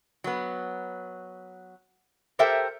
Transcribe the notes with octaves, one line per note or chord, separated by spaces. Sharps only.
F#3 B3
G4 A4 A#4 C5 E5 G5